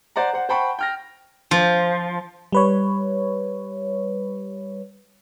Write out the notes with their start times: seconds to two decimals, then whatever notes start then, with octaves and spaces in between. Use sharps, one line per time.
0.16 C5 D5 F#5 A#5
0.34 C5 F#5
0.49 C5 F#5 G5 A5 B5 C#6
0.79 G5 F6 A#6
1.51 F3
2.52 G3 B4 C#5